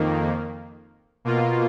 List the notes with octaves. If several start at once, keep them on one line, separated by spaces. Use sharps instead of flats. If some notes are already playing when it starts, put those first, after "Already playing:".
Already playing: F2 D#3 A#3
B2 A#3 F4